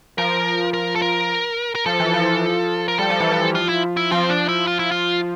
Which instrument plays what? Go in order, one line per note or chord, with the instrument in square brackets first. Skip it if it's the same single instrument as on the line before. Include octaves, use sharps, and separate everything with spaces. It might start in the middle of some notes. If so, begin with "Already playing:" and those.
[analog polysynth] F3 [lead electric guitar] A#4
[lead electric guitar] A#4
A4
A#4
A#4
[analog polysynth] F3 [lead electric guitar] A4
[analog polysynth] E3
F3
[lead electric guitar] A#4
[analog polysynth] G3 [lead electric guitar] A4
[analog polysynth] F3
E3
F3
[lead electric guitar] F4
E4
E4
[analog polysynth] F3 [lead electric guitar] C4
[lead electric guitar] D4
E4
F4
E4
F4